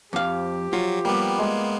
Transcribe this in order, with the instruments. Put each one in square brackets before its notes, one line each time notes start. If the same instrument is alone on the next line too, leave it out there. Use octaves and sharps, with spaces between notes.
[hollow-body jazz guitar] F2 F5 [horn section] F3 G4
[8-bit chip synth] F#3 [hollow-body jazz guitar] F4
[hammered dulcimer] G3 [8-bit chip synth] A#3 B3
[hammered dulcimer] G#3